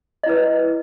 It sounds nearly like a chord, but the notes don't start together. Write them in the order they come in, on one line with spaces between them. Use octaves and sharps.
D#5 E4 B4